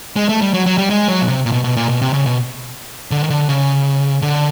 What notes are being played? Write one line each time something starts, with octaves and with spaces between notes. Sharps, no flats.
G#3
A3
G3
F#3
F#3
G3
G#3
F#3
B2
C3
A#2
B2
B2
A#2
B2
C3
C#3
B2
D3
D#3
D3
C#3
D3